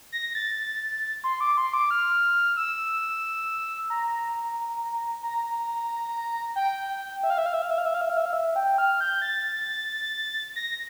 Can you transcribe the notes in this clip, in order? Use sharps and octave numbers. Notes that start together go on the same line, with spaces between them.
A#6
A6
C6
D6
C6
D6
F6
E6
A#5
A#5
G5
E5
F5
E5
F5
E5
F5
E5
F5
E5
F5
E5
F5
E5
F5
E5
G5
F6
G6
A6
A#6